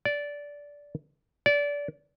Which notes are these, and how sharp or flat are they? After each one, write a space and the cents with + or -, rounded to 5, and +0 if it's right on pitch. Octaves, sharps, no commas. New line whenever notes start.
D5 -15
D5 -25